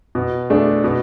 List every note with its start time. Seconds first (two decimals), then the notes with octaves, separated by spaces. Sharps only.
0.15 B2
0.50 A3 D4 G#4
0.84 B2